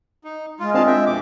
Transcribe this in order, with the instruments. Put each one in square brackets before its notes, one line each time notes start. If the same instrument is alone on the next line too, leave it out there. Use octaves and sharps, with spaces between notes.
[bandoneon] D#4
[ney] G#3 [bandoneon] F4
[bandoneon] D#3 F5 A5 [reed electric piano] C4 D4 F4
[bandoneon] E5 G5
F2 B2 D6